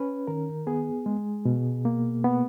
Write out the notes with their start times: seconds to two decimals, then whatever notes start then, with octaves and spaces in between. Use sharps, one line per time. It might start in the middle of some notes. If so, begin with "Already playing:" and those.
Already playing: C#4 B4
0.27 D#3 A#4
0.67 B3 G#4
1.06 G#3
1.45 B2
1.85 A#3
2.24 B3